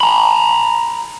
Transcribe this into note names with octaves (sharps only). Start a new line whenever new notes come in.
A#5 B5